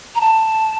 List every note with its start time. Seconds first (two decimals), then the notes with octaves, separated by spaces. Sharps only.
0.15 A#5
0.21 A5